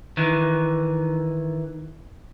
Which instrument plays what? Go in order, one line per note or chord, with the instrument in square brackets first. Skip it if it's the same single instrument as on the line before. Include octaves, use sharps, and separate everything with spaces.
[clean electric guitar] D#3 E3